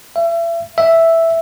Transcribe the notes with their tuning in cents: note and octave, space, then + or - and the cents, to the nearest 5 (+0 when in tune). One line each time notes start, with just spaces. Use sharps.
E5 +35
E5 +0